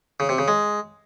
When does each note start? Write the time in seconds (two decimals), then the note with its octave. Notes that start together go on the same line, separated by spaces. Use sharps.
0.20 C#3
0.29 C3
0.38 C#3
0.48 G#3